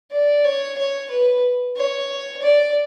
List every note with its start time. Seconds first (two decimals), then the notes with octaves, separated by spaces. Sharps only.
0.11 D5
0.44 C#5
0.78 C#5
1.10 B4
1.76 C#5
2.42 D5